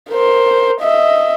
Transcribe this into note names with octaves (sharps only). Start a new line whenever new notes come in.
A#4 C5
D#5 E5